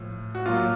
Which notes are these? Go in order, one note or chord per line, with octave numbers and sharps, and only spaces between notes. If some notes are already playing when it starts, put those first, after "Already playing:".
Already playing: A2 F3
F#4
A#2 F#3 F4